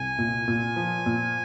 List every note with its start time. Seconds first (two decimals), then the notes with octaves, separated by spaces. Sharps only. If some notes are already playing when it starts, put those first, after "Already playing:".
Already playing: C2 G#5
0.18 A#2
0.48 A#2
0.76 F3
1.06 A#2